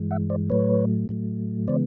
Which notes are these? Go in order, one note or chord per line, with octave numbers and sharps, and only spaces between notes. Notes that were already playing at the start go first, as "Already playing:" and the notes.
Already playing: G2 E3 G#3
E5 F#5
C5 D5
A2 F#3 A3 B4 C#5
A2 F#3 A3
C#3 E3 G#3 B3 C5 D5